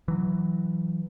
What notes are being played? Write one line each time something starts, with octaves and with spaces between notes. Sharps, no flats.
E3 F#3